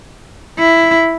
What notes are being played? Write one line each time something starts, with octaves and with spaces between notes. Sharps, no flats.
E4